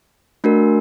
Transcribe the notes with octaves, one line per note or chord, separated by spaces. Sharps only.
A3 D4 F#4 A#4